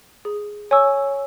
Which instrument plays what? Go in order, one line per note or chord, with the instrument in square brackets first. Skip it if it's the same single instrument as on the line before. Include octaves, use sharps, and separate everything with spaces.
[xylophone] G#4
C#5 G#5 C#6 E6